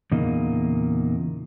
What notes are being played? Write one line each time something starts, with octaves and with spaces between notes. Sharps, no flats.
E2 A#2 C#3 A#3 D#4